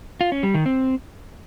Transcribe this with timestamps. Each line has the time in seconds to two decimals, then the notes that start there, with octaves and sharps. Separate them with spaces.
0.21 F4
0.32 C#4
0.43 G3
0.54 D#3
0.66 C4